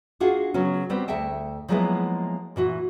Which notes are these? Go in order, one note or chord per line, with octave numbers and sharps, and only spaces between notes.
D4 F4 F#4 G#4
C#3 F#3 B3 C#4
G3 B3 C4 G4 C5
D2 A4 E5 G5 A5
F3 F#3 G#3 A#3 B3 E4
A#2 E3 F#4